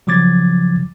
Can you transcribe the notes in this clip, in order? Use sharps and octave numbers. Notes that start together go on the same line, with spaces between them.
C#3 F3 F#3 D6 G#6 A6